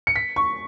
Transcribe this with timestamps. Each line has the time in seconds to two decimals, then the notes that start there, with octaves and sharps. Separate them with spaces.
0.07 C#7
0.16 B6
0.36 C#6